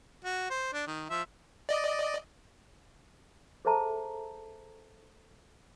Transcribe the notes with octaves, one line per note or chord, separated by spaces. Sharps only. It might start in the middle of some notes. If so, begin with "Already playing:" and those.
F#4
C5
D4
D#3
F3 E5
D5 D#5
G#4 A4 C5 E5 A5 A#5